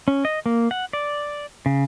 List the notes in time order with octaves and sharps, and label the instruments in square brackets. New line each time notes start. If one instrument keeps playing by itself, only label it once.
[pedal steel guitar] C#4
D#5
A#3
F#5
D5
C#3